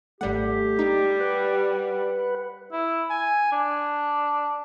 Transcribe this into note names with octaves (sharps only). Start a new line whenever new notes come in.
G#1 G3 A3 G4 F#5
G3 D#4
B4 F#5
E4
G#5
D4